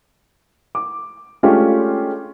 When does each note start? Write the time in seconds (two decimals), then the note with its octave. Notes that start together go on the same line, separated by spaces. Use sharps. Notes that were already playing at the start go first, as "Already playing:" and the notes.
0.75 D6
1.43 G#3 A3 C#4 D4 F4 G4